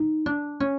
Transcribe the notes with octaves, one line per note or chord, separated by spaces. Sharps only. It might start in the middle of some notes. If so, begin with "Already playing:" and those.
Already playing: D#4
D4
C#4